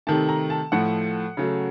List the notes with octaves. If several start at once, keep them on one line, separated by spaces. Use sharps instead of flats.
C3 D#3 A3 A5
A#5
A5
A2 F3 A3 F#5
C#3 F#3 A3